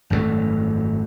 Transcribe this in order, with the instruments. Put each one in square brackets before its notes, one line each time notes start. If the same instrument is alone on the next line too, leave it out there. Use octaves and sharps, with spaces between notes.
[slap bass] G#1 F#2 A#2 A3